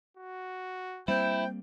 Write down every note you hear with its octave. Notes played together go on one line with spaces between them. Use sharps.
F#4
G3 A#3 C4 E4 C5 G5